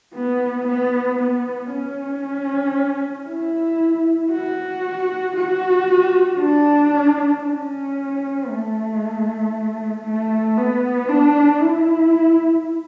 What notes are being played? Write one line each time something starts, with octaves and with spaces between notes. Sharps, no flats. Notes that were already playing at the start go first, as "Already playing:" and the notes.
B3
B3
B3
C#4
E4
F#4
F#4
D4
C#4
A3
A3
B3
D4
E4